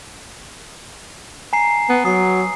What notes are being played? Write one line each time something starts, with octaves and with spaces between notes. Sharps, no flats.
G#5 A#5 C7
B3
F#3 D#6 C7